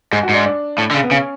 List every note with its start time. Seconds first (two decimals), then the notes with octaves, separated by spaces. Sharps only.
0.12 G#2 G#4
0.23 F#4
0.29 G#2
0.34 D4
0.46 D4
0.78 A2
0.91 D3
0.94 C#3
1.04 B3
1.11 C#3 C#4